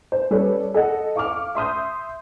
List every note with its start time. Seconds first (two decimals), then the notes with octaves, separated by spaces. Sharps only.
0.12 C5
0.31 G3 C#4 A4 B4 C#5 D5
0.74 A4 D#5 F#5
1.16 F5 C#6 D6 F6
1.55 E5 C6 D#6 G6